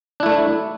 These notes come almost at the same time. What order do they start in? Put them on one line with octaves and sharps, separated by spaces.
D4 E4 A3